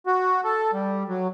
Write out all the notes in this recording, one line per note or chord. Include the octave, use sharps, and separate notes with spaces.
F#4
A4
G3
F#3